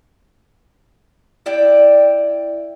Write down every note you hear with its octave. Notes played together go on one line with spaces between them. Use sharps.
E4 D5 G5